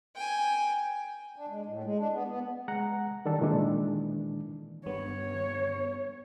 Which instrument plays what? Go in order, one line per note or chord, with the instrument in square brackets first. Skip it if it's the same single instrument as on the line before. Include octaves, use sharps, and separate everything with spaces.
[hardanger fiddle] G5 G#5
[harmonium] D4
G#3
A2
G#3
D4
B3
B3
[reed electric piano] G#3 F#5 A#5
D#3 E3 G3 D4 G4 A4
A#2 D#3 E3 G#3 D4
[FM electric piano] G2 B3 [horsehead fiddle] C#5